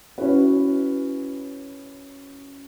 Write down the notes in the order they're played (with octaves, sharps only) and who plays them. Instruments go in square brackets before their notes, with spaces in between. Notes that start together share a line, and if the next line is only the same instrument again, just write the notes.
[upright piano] C#4 E4 F#4 B4